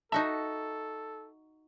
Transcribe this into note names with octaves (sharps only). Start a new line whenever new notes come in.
D#4 F#4 A4 E5 A5